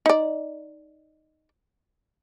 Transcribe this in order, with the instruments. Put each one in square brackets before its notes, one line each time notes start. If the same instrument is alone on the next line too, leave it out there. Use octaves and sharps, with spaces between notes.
[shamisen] D#4 D5